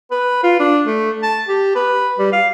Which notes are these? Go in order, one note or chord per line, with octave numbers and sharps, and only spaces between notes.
B4
F4
D4
A3
A5
G4
B4
G3
F5